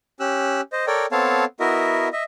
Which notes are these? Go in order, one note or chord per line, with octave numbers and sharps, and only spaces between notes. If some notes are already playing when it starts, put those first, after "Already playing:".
C#4 G4 E6 F#6
C5 D#5
A4 A#4 C#5 D5 G5
B3 C4 A4 C#5 F5 A5
B3 E4 F#4 A#4 D#5 E5
D#5 E5